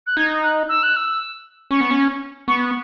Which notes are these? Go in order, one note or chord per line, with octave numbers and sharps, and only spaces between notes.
F#6
D#4 G#6
F#6
E6
F#6
E6
C#4 C#6
B3
C#4
B3 C#6